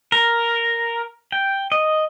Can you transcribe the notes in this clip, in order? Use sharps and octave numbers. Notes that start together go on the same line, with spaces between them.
A#4
G5
D#5